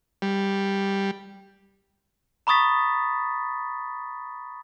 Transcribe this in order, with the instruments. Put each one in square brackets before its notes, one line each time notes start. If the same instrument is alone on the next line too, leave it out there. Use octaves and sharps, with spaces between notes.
[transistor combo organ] G3
[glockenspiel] A#5 B5 C#6 D#6 A6 B6